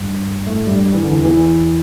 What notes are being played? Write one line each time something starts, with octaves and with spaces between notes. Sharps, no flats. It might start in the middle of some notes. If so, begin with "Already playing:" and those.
Already playing: G2 G3
A2 A3
G2 G3
G3
E3
D3
E2 E3
E2 E3